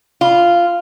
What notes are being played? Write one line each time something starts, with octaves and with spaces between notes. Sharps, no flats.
F4